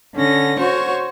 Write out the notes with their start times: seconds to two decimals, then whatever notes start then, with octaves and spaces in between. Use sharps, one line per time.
0.14 D3 C#4 A#6
0.58 F#4 C5 C#5 C#6